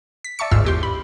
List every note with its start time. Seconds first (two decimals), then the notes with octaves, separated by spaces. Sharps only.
0.25 B6
0.39 D5 E5 A5 C#6 C#7
0.51 G#1 D2 G#2 F4 E6
0.65 E2 G4 C6
0.83 B5